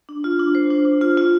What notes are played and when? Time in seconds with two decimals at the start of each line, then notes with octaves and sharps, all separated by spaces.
0.09 D4
0.24 F4
0.39 D4
0.55 C5
0.70 D4
0.85 D4
1.01 F4
1.17 F4